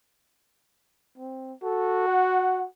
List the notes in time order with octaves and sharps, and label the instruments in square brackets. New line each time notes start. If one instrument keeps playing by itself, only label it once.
[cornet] C4
[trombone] F#4 [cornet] A4
[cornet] F#5